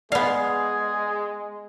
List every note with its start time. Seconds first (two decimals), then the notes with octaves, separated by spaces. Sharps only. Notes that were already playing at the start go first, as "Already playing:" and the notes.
0.12 G#3 B3 G#4 D5 F5